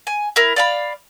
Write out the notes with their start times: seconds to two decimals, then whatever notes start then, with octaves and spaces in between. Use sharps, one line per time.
0.07 G#5
0.36 E4 A#4
0.56 D5 F5 B5